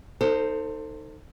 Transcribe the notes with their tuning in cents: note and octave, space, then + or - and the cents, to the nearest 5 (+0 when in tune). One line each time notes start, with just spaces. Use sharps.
D#4 +0 A4 +30 C5 +0